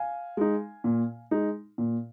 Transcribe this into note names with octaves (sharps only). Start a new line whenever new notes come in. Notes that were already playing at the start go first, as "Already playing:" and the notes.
Already playing: F5 G#5
G#3 D#4
A#2
G#3 D#4
A#2